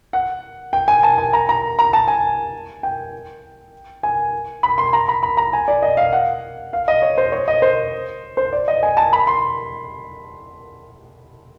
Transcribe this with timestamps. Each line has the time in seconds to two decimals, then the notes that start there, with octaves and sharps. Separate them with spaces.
0.13 F#5
0.73 G5
0.88 G#5
1.03 A5
1.18 G#5
1.33 A#5
1.49 A#5
1.79 A#5
1.93 A5
2.08 G#5
2.83 G5
4.03 G#5
4.63 B5
4.78 C6
4.93 A#5
5.08 B5
5.23 B5
5.37 A#5
5.53 G#5
5.68 D5
5.82 D#5
5.97 F5
6.12 F#5
6.73 F5
6.88 D#5
7.02 C#5
7.18 C5
7.32 C#5
7.48 D#5
7.62 C5
8.37 C5
8.53 D5
8.68 D#5
8.83 G#5
8.97 A5
9.13 B5
9.27 C6